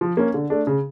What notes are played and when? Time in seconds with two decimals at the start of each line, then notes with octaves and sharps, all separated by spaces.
0.01 F3
0.17 A#3 C#4
0.34 D3
0.50 A3 D4
0.67 C#3